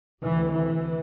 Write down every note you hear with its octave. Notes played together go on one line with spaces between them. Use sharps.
D2 C3 E3
E3